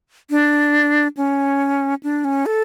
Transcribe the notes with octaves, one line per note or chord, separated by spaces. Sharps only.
D4
C#4
D4
C#4
A4